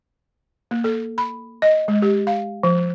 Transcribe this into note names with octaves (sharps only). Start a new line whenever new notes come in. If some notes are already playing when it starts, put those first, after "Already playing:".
A#3
A4
B5
D#5
G#3
G4
F5
F3